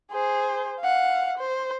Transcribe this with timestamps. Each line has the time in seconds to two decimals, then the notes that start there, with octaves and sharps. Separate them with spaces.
0.12 G#4 C5
0.80 F5 F#5
1.38 C5